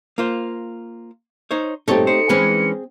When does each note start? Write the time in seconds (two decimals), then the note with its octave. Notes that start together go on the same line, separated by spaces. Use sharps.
0.18 A#3 F4 C5
1.51 D#4 C5 C#5
1.88 G2 A#2 A3 C4 D#4 G4 A4 C#5
2.07 D#4 C5 C#7
2.29 E3 G#3 C4 C#4 G#4